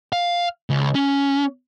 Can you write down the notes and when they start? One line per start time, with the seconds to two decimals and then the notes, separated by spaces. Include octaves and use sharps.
0.13 F5
0.70 C#2
0.95 C#4